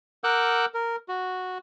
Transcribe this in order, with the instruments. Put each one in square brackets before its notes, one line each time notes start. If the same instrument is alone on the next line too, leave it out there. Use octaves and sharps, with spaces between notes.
[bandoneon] A#4 F#5 D6 E6 F#6 G6
A#4
F#4